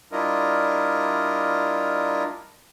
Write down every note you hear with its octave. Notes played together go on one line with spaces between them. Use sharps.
G3 D4 E4 F4 A#4 D#5